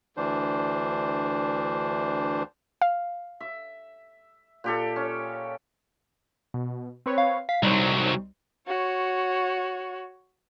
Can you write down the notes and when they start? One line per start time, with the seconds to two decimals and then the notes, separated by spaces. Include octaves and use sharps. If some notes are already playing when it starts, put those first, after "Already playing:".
0.17 D2 E3 D4 C5
2.82 F5
3.40 E5
4.64 A#2 G4 A4
4.96 C#4
6.54 B2
7.06 C4 B4 C#5
7.18 F5
7.49 F5 B6
7.63 C2 F#3 G3 D#4 C5
8.67 F#4 C#5